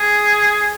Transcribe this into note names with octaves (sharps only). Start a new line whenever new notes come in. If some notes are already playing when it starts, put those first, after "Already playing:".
Already playing: G#4